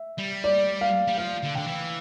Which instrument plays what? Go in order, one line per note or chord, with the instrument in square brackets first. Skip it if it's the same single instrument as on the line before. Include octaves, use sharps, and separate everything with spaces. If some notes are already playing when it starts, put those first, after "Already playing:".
Already playing: [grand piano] E5
[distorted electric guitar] G3
[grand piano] D5
F5
[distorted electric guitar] G3
[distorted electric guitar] F3 [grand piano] F5
[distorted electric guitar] D3
[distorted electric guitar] D3 [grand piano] G5
[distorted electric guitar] E3